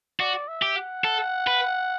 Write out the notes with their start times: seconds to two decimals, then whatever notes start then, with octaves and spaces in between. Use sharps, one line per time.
0.20 F#4 D5
0.48 E5
0.62 G4
0.76 F#5
1.04 A4
1.47 B4